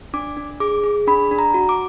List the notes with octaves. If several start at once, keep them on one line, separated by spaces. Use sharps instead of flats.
D4 D6
D4
G#4 D6
G#4
D4 B5
D4
A#5
F#4
D6